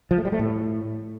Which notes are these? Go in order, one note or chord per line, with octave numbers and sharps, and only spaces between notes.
F3
A3
G3
A3
A2